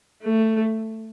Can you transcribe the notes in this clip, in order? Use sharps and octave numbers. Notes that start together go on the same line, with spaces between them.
A3